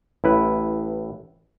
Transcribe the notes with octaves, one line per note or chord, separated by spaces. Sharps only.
A1 E4 B4